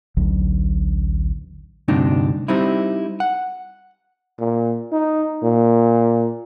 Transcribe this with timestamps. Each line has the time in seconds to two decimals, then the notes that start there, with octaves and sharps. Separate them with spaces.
0.17 A1 D2 F#3
1.88 D2 G2 C3 D4 D#4
2.48 G3 C4 D#4 E4
3.20 F#5
4.39 A#2
4.93 D#4
5.43 A#2